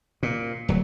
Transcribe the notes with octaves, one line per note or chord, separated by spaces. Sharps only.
A#2
D1 F#3